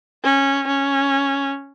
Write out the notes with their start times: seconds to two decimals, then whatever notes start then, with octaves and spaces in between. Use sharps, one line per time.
0.24 C#4
0.68 C#4